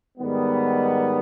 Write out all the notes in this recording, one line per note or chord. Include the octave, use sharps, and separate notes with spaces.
G#2 D#3 G3 B3